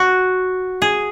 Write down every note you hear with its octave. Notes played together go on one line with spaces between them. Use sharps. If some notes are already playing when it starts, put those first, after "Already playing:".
Already playing: F#4
G#4